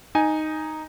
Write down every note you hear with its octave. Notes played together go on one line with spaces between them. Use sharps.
D#4 G#5